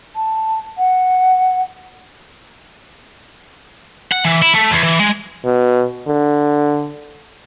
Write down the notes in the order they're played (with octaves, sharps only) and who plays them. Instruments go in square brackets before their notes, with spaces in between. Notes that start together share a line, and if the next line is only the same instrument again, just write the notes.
[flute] A5
F#5
[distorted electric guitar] F#5
E3
E4
A3
E2
E3
G#3
[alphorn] B2
D3